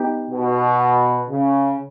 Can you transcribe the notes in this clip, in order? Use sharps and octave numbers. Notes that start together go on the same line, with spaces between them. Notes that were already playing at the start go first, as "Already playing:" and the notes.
Already playing: B3 D#4 G4
B2
C#3